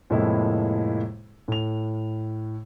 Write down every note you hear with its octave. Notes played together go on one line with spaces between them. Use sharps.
F2 A2 C3 G#3 A#3 E4
A2 F7